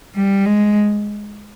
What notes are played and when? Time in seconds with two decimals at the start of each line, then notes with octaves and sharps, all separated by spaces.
0.16 G3
0.46 G#3